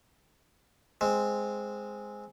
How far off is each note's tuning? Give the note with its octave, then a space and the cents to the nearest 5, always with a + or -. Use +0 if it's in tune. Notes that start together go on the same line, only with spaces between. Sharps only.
G#3 +0 C4 -5